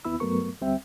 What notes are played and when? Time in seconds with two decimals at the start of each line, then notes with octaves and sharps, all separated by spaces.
0.05 D#2 B3 E4 B5 E6
0.20 G2 F#3 A3 B3 A#4 C#6
0.61 D2 G3 C4 E5 G5